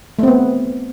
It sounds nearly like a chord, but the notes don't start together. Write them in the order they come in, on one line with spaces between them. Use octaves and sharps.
A3 C4 B3